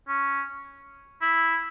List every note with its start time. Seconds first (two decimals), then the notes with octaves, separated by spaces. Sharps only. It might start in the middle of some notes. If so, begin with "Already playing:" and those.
0.08 C#4
1.22 E4